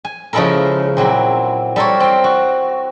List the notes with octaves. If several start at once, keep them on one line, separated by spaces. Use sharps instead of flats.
G#5
C#3 F3 G#3 E4 A4 A#4
A#2 F#3 C4 E4
G3 A4 A#4 C5 C#5
C4 G5
F#4